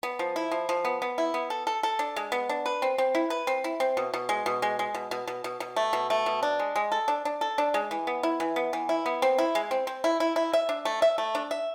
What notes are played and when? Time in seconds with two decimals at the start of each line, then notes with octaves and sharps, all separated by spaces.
0.03 B3
0.19 F3
0.36 E4
0.51 F3
0.69 F3
0.85 B3
1.02 B3
1.18 E4
1.34 B3
1.50 A4
1.67 A4
1.83 A4
1.99 D4
2.16 G#3
2.32 B3
2.49 D4
2.66 B4
2.82 C4
2.98 C4
3.15 E4
3.30 B4
3.47 C4
3.64 E4
3.80 C4
3.97 B2
4.14 B2
4.29 G#3
4.46 B2
4.62 G#3
4.79 G#3
4.94 B2
5.11 B2
5.27 B2
5.44 B2
5.60 B2
5.76 A3
5.93 B2
6.10 A3
6.26 B2
6.43 D4
6.59 G#3
6.76 G#3
6.92 A4
7.08 D4
7.25 D4
7.41 A4
7.58 D4
7.74 G#3
7.91 E3
8.07 B3
8.23 E4
8.40 E3
8.56 B3
8.73 E3
8.89 E4
9.06 B3
9.22 C4
9.38 E4
9.55 G#3
9.71 C4
9.87 C4
10.04 E4
10.20 E4
10.36 E4
10.53 E5
10.69 D4
10.85 A3
11.02 E5
11.18 A3
11.35 D4
11.51 E5